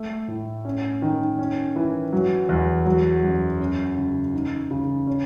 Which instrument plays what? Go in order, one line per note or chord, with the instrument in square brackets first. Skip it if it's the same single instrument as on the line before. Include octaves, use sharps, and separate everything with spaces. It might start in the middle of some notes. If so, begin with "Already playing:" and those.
Already playing: [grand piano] A3
A2
C#4
D#3
C#4
E3
F#3
E2
F#3
F#2
C#4
C#3
D#4
C#3
C#4